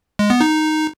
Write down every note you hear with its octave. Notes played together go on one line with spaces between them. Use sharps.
G#3
B3
D#4